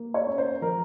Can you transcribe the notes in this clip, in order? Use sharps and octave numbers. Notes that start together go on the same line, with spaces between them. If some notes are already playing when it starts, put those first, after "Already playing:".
Already playing: A#3
C#5
C#4
C5
F3 A#4